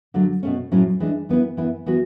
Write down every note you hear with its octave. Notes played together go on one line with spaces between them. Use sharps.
D3 F#3 A3
B2 A3 C#4
A2 F#3 C#4 E4
E3 G#3 D4
E3 B3 E4
E3 B3 E4
E3 B3 F#4